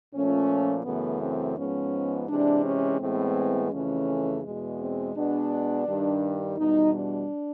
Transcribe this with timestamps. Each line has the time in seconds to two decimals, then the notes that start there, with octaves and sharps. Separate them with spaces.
0.14 A#2 F3 A3 C#4
0.85 F#2 C#3 E3 A3 B3
1.21 C4
1.56 G#2 F3 G#3 B3 C#4
2.28 C3 E3 G#3 D4
2.64 C#4
3.00 A2 E3 G#3 B3 C4
3.71 F2 C#3 E3 A3 C#4
4.43 E2 B2 G#3
4.78 C4
5.15 B2 G#3 B3 D4
5.86 G2 D#3 G3
6.58 E2 B2 G3 D#4
6.94 D4